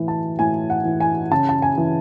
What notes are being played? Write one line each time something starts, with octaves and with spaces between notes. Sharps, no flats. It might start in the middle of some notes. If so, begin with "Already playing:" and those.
Already playing: A2 E3
A5
A2 G#5
F#5
E3
G#5
C#3 A5
A5
G#5
E3